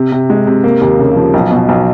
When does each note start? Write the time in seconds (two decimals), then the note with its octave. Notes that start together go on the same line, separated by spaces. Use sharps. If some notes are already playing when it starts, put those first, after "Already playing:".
Already playing: C3
0.12 C3
0.30 G#3
0.47 C3
0.64 A#3
0.81 D#2
0.99 C#3
1.16 F3
1.34 B1
1.51 B2
1.69 B1